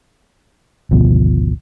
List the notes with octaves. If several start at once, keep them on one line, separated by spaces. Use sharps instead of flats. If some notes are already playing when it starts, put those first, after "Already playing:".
G#1 D2 B2 F3